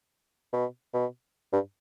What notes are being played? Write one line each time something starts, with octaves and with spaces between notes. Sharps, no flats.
B2
B2
G2